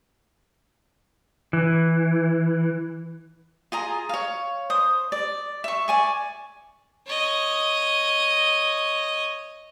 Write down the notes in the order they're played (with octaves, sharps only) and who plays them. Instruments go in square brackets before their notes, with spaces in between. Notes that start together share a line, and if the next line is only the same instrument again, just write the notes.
[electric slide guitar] E3
[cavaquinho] F4 G#4 A#5
C#5 F5
C5 D#6
D5
E5 C#6
D5 G#5 C#6
[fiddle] C#5 D#5